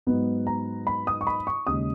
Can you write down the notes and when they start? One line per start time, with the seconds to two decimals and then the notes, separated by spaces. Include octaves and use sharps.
0.07 G#2 F#3 B3 D#4
0.47 A#5
0.87 B5
1.07 D#6
1.21 C#6
1.27 B5
1.47 C#6
1.67 D#2 C#3 G#3 D#4 D#6